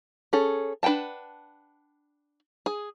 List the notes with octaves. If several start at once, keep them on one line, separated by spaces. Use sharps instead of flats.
C#4 G#4 A4
D4 B4 F#5 G5 A5
G#4